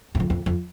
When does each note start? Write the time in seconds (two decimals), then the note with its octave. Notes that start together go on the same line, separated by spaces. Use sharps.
0.15 F#2
0.20 F2
0.30 F2
0.46 F2